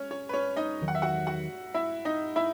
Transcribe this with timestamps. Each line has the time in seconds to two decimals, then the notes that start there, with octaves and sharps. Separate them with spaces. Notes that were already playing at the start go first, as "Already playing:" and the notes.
Already playing: C#4 C#5
0.11 C#4 C#5
0.29 B4
0.33 C#4 C#5
0.57 D#4 D#5
0.81 E2 D#3 F#3
0.88 F#5
0.95 E5
1.02 F#4 F#5
1.27 F#4 F#5
1.74 E4 E5
2.05 D#4 D#5
2.36 E4 E5